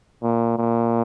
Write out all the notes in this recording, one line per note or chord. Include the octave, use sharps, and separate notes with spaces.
A#2
A#2